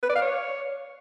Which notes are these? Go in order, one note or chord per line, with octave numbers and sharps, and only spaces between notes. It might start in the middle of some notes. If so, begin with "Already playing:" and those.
B4
D5
F5
C#5